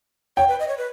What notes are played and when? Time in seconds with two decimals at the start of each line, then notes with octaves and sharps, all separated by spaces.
0.37 C#5 G5
0.48 B4
0.59 D#5
0.68 C#5
0.78 B4